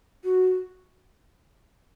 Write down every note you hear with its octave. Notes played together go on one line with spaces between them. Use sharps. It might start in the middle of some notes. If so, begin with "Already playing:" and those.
F#4